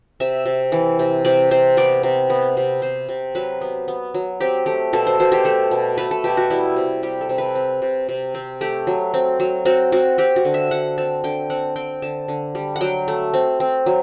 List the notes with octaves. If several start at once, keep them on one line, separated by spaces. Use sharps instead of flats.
C3 E5
C3
E3
C3
C3 D5
C3 C5
B3 D5
C3
B3
C3
C3 C5
C3
F#3 B4
B3
B3
F#3
C4 G4
A3 G4
B2 A4
C5
B2 C5
G4
A3 A4
B2
A3 B4
A4
B2 G4
F#4
G3 E4
C3
G3 G4
A4
C3
B4
C4
C3
C3
C4
A3 G4
F#3
C4
F#3
C4 F#4
C4 F#4
C4 G4
F#4
D3
E5
D3 F#5
C4 A5
D3 G5
C4 F#5
C4 G5
D3 A5
D3
G3
F#5
F#3 G5
A3
C4
C4
F#3